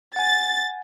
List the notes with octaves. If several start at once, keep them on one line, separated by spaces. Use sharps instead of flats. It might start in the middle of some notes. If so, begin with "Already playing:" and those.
F#5 G#5 A6